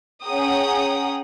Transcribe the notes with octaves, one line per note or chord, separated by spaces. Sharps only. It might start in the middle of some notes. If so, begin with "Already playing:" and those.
C#4 G#4 F#5 G5 A#5 D#6